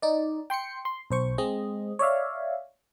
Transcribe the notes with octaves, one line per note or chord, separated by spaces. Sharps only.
D#4 D5
G5 C6 C7 C#7
C6
B1 C5 C#6
G#3 C4 D#5
C#5 D5 E5 F5